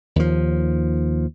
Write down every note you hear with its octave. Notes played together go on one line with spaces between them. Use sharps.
D#2 F3